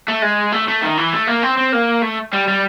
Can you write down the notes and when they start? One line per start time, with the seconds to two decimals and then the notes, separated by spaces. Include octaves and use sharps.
0.08 A3
0.22 G#3
0.52 A3
0.68 A3
0.82 D#3
0.97 E3
1.13 A3
1.27 A#3
1.43 C4
1.57 C4
1.72 A#3
2.02 A3
2.33 G3
2.48 G3